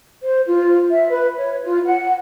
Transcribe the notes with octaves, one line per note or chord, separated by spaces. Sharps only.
C5
F4
E5
B4
C#5
F4
F#5